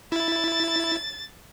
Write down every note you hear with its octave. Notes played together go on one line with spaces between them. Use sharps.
E4 A6